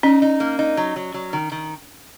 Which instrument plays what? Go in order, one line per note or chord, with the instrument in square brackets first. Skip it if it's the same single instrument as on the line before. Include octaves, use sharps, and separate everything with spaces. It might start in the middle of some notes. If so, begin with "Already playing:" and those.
[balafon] C#4 [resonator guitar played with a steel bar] D#4
[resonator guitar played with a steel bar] D#4
A#3
D#4
F#3
F#3
F#3
D#3
D#3